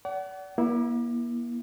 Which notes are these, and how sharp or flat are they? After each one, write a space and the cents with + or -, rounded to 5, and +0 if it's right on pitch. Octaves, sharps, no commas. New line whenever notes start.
D5 -35 F#5 +30
A#3 +40 E4 -5